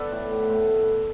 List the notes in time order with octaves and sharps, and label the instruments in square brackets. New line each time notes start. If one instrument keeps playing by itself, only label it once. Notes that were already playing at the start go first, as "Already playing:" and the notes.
Already playing: [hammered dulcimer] B3 A4 B4 D5
A2
A2
A2